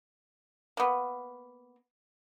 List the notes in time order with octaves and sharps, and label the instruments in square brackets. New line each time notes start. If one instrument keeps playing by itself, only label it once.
[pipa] A#3 B3